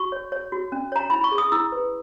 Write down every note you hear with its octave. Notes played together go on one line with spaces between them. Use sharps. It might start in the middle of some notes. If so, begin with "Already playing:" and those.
Already playing: F#4 C#6
C#5
C#5
F#4
C#4
C#5 A#5
E4 B5
C#6
G#4
D#6
E4 E6
B4